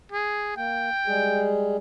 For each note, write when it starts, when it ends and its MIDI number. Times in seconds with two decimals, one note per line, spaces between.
0.12 0.57 68
0.57 0.90 58
0.57 1.55 79
1.07 1.77 55
1.07 1.77 56
1.07 1.77 68